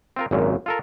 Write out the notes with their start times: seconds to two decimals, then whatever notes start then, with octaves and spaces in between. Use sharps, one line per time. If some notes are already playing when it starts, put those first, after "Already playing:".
0.16 C4 F4 A#4
0.31 G#1 F#2 A#2
0.66 F4 A4 A#4